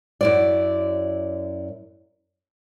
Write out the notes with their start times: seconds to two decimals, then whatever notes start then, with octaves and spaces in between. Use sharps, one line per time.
0.21 F#2 E4 D5